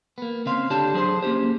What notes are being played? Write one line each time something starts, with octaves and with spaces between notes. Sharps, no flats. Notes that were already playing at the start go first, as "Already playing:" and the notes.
A#3 B3
C#3 C4 F5 C6
D3 D4 G4 A4 C#5 A5
F#3 G#4 C5 C6
A#3 C#4 F4 G4 C5